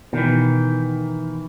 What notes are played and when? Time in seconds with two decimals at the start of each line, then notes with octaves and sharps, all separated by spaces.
0.13 B2 D#3 E3